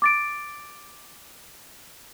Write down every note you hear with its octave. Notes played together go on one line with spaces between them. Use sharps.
D6 A6 D7